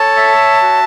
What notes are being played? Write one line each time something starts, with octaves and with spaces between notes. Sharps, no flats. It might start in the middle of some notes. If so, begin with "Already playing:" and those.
Already playing: A4 C#5 A5
E5
F#4